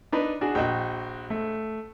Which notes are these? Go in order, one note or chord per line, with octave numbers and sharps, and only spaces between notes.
D4 D#4 B4
D4 F#4 G#4
A#1 F#4 D#5 G5
A3